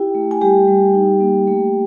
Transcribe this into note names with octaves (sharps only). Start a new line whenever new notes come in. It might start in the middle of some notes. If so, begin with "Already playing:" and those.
Already playing: E4 G4 G5
A3
G#5
G3 G4 G5
G3
D#4
A#3
A3